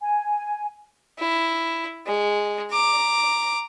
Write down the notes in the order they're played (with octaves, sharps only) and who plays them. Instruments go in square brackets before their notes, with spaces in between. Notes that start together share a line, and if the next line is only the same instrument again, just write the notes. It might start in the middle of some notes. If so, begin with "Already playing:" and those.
[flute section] G#5
[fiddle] E4
G#3
A#5 D6